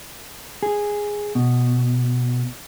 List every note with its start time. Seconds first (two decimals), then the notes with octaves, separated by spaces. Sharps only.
0.63 G#4
1.35 B2